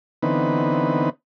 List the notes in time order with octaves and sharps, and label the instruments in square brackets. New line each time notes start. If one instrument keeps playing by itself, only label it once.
[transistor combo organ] D3 E3 B3 C4 D#4 B4